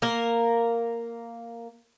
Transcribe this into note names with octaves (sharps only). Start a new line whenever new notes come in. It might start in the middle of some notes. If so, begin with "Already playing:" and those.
A#3 A#4